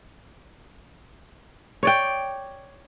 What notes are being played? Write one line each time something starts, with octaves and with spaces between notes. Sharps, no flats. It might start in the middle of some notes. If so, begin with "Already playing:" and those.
C#5 D5 G5